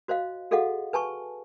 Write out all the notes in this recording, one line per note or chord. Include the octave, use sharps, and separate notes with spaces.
F#4 C5 D#5 F5
F#4 G#4 A4 D#5 F5 F#5
B4 G#5 A5 C#6